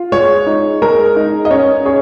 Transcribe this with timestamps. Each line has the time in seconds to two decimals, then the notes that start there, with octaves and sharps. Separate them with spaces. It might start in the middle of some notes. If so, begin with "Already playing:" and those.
Already playing: F4
0.12 G#3 C#5
0.47 D#4
0.82 G#3 A#4
1.16 D#4
1.45 D#5
1.51 C#4 C#5
1.85 G#4 C#5